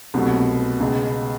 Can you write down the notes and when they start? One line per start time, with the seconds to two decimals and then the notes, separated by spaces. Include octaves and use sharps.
0.14 C2 B2 F#3 A3
0.80 C#2 B2 G#3